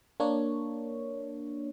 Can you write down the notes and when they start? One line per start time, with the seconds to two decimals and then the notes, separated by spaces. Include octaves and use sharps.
0.20 A#3 D4 C#5